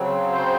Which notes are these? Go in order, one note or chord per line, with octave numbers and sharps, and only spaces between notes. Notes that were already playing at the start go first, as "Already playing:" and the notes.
Already playing: C#3 F#3 C4
C5